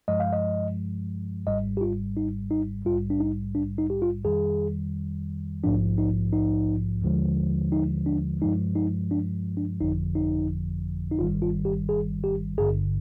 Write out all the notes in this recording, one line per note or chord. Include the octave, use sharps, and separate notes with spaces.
G2 F3 G#3 D#5
F5
D#5
G#1 G#2 G3 D#5
G4
F4
D#4
D#4
A#1 G#2 G3 F4
D4
D#4
D4
D#4
G4
F4
F2 D#3 G3 G#4
A#1 G#2 F3 D4
D#4
D#4
D#2 D3 F3 G#3
D#4
D4
G2 F3 G#3 D#4
D#4
D4
D4
G1 F2 D3 F3 D#4
D#4
D#4
G1 G2 D#3 G3 F4
F4
G4
G#4
G4
G#1 G2 D3 G#4